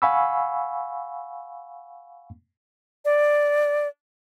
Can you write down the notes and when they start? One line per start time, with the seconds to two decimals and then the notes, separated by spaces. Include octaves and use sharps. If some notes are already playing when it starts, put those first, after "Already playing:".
0.02 F5 F#5 G#5 B5 C#6 E6
3.05 D5